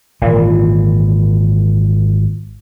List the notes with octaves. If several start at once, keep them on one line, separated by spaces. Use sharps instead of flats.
G#1 A#2 E3